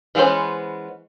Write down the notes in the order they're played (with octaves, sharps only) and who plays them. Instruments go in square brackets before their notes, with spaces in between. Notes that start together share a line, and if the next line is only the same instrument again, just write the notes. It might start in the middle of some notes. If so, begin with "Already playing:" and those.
[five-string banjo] E3 G#3 B3 C#4 C5